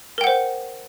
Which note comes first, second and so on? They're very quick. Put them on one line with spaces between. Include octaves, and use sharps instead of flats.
A#4 G5 F#5 C5